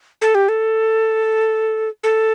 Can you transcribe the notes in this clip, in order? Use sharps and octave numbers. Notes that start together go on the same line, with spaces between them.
A4
G4
A4
A4